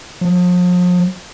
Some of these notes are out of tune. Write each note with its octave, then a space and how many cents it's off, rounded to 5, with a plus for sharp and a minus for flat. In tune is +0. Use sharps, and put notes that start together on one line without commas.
F3 +40